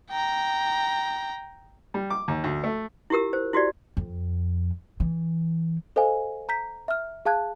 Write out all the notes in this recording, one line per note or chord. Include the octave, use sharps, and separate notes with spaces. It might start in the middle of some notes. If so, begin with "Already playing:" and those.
G5 A#5
G3
D6
D#2
D2
A3
E4 F4 G4 A#4 E6
C5
E4 F#4 G4 D5
F2
E3
A4 C5 D#5 F5 G#5
A#5 G6 B6
E5 F6
G#4 F5 A5 F#6 G#6